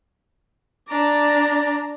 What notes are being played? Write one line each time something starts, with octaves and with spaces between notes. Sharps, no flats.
D4 D5 A#5